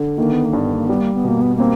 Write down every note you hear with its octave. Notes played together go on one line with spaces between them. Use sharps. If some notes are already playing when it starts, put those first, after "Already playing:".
Already playing: D3
D#3 A#3
B3
A#3
G2
B3
A#3
G3 B3
A#3
B3
B2 A#3
B3
A#3 C4